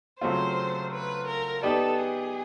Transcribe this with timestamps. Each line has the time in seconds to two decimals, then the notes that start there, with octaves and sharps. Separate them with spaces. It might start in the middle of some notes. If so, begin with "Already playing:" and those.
0.21 C#3 F#3 A3 C4 F4 C5
0.92 B4
1.27 A#4
1.63 B3 D#4 G4 A4 B4 D5
1.98 G#4